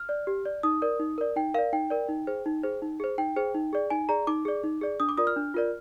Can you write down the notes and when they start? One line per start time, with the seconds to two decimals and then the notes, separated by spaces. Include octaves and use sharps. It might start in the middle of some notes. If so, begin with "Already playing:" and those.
Already playing: F6
0.09 D5
0.27 G4
0.46 D5
0.63 D#4 D#6
0.82 A#4 D5
1.00 D#4
1.18 A#4 D5
1.36 D#4 G5
1.54 A#4 D5 F5
1.72 D#4 G5
1.90 A#4 D5
2.08 D#4
2.27 G#4 C5
2.46 D#4
2.63 G#4 C5
2.82 D#4
3.00 G#4 C5
3.18 D#4 G5
3.36 G#4 C5
3.55 D#4
3.73 G#4 D5
3.90 D#4 G#5
4.09 G#4 D5 A#5
4.27 D#4 D6
4.45 G#4 D5
4.63 D#4
4.81 G#4 D5
5.00 D4 D#6
5.09 D6
5.17 F4 A#4 D5 D#6
5.27 F6
5.36 D4
5.54 F4 A#4 D5